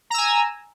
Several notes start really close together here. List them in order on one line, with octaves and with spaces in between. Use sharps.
A#5 E6 G#5